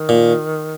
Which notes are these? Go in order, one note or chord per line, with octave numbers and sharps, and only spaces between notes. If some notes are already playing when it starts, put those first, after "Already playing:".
Already playing: D#3
A#2